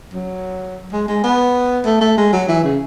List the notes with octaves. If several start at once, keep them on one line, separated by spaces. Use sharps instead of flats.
F#3
G#3
G#3
B3
A3
A3
G#3
F#3
E3
C#3